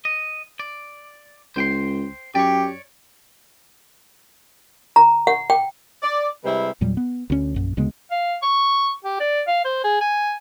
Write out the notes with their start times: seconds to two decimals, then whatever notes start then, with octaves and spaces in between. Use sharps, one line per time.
0.05 D#5
0.60 D5
1.56 C#2 C5 G5 C6
2.35 F#2 G4 C#5 D5
4.96 A#5
5.27 F#5
5.50 G5
6.02 D5
6.44 C3 G3 G#3 E4 B4 C5
6.81 E2 A#2 F#3 G3
6.97 B3
7.30 D2 C#4
7.54 A#1 F#2
7.77 D2 C#3 G#3 B3
8.11 F5
8.42 C#6
9.04 G4
9.20 D5
9.48 F5
9.65 C5
9.84 G#4
10.01 G#5